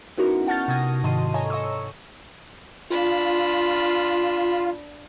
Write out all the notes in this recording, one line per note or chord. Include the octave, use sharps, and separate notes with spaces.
B3 C#4 D#4 E4 F#4 A#4
F#5 A5 C#6 F6 G6 A6
C3 A5 D#6 G#6 A#6
G#2 D#3 D#5 A5 C6 D#7
A4 C#5 D#5 G#5 A#5
D#5 C#6 E6
D4 F4 B5